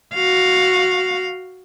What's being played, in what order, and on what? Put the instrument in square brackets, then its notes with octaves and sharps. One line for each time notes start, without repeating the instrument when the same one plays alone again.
[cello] F#4 F5